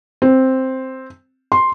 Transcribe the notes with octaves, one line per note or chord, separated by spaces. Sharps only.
C4
C6